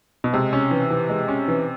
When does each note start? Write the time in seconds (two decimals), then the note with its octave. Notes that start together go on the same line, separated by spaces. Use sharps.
0.24 B2
0.33 C3 G#3
0.53 C#4
0.71 E3
0.90 E3
1.09 G#3
1.28 C#4
1.48 E3